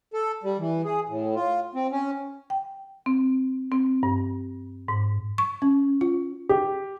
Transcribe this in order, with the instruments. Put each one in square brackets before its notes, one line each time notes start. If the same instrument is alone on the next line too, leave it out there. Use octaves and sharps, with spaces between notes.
[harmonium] A4
G3
E3
G#4
A2
F4
C4
C#4
[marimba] G5
C4
C4
G2
G#2
[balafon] C#6
C#4
F4
[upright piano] G4